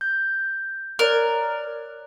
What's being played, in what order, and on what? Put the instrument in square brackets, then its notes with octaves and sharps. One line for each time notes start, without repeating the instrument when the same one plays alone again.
[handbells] G6
[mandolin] A#4 [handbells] C#5 D5 F#6